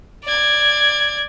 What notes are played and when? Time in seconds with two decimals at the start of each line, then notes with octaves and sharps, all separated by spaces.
0.25 D5 G#6